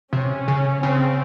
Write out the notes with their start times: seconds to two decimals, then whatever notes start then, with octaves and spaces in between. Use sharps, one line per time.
0.13 C3 C#4
0.48 C#3
0.83 C#3 C4